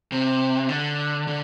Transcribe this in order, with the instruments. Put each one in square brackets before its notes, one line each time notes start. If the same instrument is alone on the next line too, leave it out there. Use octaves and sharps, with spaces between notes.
[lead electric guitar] C3
D3
D3